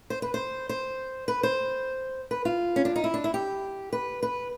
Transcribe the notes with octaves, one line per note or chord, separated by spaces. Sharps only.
C5
B4
C5
C5
B4
C5
B4
F4
C#4
D4
D#4
E4
D4
E4
G4
B4
B4